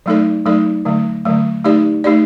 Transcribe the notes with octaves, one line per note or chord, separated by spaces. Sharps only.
F#3 A3 D#4 A4 D5
F#3 A3 D#4 A4 D5
D3 F#3 A3
D3 F#3 A3
A3 D#4 G4 D5
A3 D#4 G4 D5